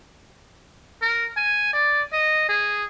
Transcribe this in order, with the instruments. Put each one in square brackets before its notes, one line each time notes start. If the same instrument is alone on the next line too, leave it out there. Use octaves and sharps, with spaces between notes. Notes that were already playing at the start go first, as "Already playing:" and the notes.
[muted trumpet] A#4
G#5
D5
D#5
G#4